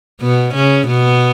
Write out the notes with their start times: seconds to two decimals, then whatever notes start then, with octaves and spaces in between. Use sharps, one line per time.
0.22 B2 B3
0.55 C#3 C#4
0.88 B2 B3